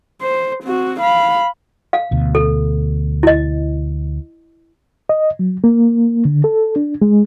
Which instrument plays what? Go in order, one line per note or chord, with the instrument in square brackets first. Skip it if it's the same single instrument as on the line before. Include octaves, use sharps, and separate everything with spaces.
[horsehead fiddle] C5
C4 F#4
F5 B5
[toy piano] F5
[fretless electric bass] D2 B2
[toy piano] A4
E4 D#5
[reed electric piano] D#5
F#3
A#3
D3
A4
D4
G#3